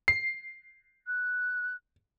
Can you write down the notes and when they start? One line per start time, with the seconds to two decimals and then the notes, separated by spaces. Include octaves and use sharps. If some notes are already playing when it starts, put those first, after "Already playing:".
0.08 C7
1.07 F#6